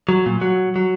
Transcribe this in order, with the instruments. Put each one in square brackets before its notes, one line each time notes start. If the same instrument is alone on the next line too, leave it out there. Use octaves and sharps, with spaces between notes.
[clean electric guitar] F#3
A#2
F#3
F#3